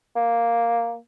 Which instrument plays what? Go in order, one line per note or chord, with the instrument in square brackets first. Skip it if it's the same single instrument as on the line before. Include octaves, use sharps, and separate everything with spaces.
[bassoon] A#3